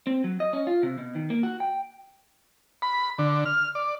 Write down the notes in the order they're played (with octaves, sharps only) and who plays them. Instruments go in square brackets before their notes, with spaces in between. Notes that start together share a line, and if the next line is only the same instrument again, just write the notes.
[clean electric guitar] C4
F#3
D#5
C#4
F4
C3
B2
D#3
A#3
F#4
G5
[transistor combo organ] B5
D3
F6
D5